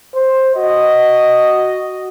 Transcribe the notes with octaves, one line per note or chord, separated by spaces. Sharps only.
C5
F#4 D#5